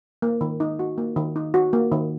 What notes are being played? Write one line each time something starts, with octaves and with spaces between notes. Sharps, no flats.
A#3
D#3
D#4
F#4
A#3
D#3
D#4
F#4
A#3
D#3